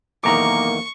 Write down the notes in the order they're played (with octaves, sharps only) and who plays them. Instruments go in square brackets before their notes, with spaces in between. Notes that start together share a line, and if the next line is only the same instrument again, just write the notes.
[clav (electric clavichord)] B1 E2 D#3 [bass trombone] A#3 [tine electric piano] A#5 D6 [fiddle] C#6